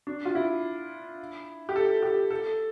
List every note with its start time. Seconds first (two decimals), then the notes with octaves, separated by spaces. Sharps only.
0.07 D4
0.25 F4
0.35 E4
1.69 G4
1.76 A4
2.03 G4
2.31 A4